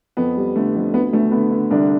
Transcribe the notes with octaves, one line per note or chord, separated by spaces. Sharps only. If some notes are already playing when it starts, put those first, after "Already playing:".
F2 B3
G3
D3 A3
F2
D2 B3
D2 A3
D3 B3
D3
C2 D3 D4